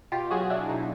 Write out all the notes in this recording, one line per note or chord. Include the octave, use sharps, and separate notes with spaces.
B2 F4 G4
F#3 F#4 G#4
F#3 D4 E4
B2 D#4